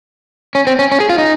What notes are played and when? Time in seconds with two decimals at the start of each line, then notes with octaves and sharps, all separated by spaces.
0.55 C#4
0.67 C4
0.79 C#4
0.92 C#4
1.00 G#4
1.10 F4
1.18 D#4